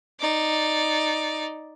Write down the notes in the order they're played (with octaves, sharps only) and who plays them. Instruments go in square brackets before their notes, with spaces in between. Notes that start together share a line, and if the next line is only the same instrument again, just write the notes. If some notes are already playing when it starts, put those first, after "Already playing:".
[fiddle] D#4 D5